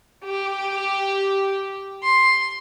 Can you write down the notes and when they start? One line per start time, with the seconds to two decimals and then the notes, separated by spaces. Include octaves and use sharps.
0.24 G4
2.03 C6